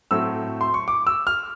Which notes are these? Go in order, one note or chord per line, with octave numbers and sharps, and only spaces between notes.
A2 F#3 A3 C4 E6
C6
C#6
D6
E6
F6